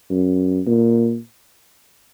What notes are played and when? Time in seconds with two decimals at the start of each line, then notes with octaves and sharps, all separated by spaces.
0.10 F#2
0.67 A#2